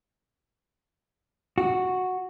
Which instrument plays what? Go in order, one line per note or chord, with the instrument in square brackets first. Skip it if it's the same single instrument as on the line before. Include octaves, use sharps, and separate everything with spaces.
[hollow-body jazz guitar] F#4